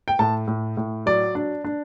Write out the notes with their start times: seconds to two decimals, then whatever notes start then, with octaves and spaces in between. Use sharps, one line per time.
0.08 G5
0.19 A2 A5
0.47 A2
0.77 A2
1.06 F#3 D5
1.35 D4
1.65 D4